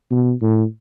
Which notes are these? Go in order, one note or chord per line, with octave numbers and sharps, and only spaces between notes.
B2
A2